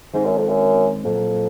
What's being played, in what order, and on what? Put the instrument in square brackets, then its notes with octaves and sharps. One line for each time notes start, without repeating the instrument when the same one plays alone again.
[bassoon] G#2 [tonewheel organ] D#3 G#3 C4
[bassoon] F#2
F2
F#2
[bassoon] F2 [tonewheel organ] A#2 F#3 A#3